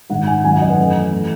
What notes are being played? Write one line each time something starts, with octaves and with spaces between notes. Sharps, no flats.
G#2 D#3 G#3 F#5
G#5
F#2 D#3 F#3 G#5
F#5
D#5
B4
F#2 E3 A3
E3 A3